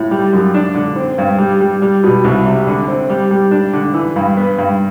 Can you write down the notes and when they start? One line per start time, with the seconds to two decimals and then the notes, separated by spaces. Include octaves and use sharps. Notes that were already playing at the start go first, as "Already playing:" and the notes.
Already playing: A2
0.11 G3
0.33 F#2
0.54 D4
0.75 D3
0.96 C4
1.18 G2
1.38 G3
1.61 G3
1.82 G3
2.03 B2
2.24 C2
2.46 C3
2.67 D3
2.88 C4
3.09 G3
3.31 G3
3.51 D4
3.73 D3
3.94 E3
4.16 G2
4.37 B3
4.58 G2